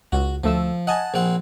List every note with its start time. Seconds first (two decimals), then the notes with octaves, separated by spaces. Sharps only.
0.12 C#2 F#4
0.44 D2 F3 A3 E6
0.87 D#5 F#5 G#5 A5
1.14 A#1 C4 F#5